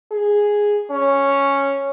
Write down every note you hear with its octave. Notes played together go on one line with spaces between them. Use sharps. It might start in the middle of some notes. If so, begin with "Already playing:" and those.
G#4
C#4